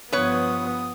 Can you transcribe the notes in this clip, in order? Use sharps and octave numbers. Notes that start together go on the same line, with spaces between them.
G2 F3 B3 B4 C#5 D#6